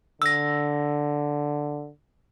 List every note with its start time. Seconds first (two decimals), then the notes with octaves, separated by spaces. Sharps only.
0.22 D3 E6 A#6